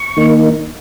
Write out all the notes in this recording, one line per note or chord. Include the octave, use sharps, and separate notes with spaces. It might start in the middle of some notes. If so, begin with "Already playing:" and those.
Already playing: C#6
D#3 A#3 D#4